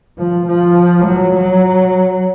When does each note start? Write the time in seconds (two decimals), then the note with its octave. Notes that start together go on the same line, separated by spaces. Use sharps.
0.18 F3
0.47 F3
1.06 F#3
1.34 F#3